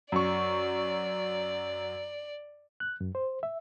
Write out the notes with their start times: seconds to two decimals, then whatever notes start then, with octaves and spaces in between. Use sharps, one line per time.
0.12 F#2 D5 C#6
2.80 F#6
3.01 F#2
3.15 C5
3.43 E5